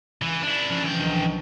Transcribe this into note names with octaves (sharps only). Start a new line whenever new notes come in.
C#2 E3 D7
D4 E4
F3 C#4
E3 D4 G5 G6
B1 D#3